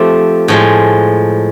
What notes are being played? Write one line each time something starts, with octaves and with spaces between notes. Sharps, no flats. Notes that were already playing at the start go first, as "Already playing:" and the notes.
Already playing: F3 A3 C4 G4
A2 F3 G#3